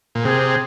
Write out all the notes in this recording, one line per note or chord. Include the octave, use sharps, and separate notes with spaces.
A#2
C3 G#4